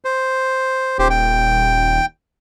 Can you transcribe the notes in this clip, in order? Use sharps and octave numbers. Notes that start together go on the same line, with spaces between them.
C5
D#1 G4 C5
G5